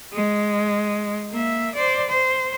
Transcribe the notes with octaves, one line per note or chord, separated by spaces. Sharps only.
G#3
A#3 E5
C5 D5
C5